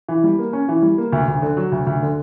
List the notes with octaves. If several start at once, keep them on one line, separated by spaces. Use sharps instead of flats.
E3
G3
A#3
C#4
E3
G3
A#3
D2
D2
D3
F#3
D2
D2
D3